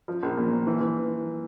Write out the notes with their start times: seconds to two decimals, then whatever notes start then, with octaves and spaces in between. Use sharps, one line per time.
0.08 F3
0.23 A#1
0.37 A#2
0.52 A#2
0.67 E3
0.81 E3